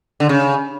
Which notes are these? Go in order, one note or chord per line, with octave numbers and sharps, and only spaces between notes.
D3
C#3